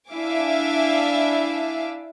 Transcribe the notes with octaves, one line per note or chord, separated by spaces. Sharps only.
D4 E4 E5 F5 G#5 D6